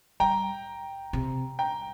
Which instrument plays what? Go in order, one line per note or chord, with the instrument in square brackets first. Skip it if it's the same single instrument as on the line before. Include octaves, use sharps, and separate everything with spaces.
[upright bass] G3 [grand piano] G5 A#5
[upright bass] C3
[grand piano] G5 A#5